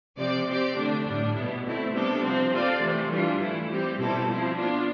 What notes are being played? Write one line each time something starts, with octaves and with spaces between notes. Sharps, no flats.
C3 F3 C4 G4 D5
C4 G4 D5
D3 A3 D4
A2 G3 D4
B2 B3 E4
A3 C4 E4
C3 G3 B3 D4 A4
C3 F3 C4
C4 F4 A4 D5 F5
C3 E3 A3
E3 G3 D4 F4
E3 A3 E4
G3 C4 G4
B2 G3 C4 E4 A4
F3 C4 E4
B3 D4 F4